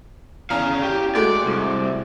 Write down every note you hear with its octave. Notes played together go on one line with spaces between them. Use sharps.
E2 C#4 F5 A#5
G4
G#3 A3 F#4 D5
C2